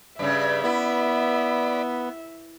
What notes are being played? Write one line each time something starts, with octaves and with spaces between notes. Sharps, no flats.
G2 C#3 D5 E5 B5
B3 E4